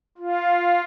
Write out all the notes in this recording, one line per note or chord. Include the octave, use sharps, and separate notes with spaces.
F4